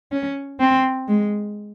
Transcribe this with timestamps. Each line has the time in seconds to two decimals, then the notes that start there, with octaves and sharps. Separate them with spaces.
0.12 C#4
0.60 C4
1.08 G#3